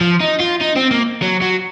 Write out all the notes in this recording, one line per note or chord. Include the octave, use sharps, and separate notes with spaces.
F3
D#4
F4
D#4
C4
A#3
F#3
F#3